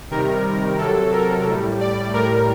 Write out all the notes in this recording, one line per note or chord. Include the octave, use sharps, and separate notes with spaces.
C3 D#3 G3 A#4
C3 F#3 A4
A#4
A2 G3
D5
A2 G3 A#4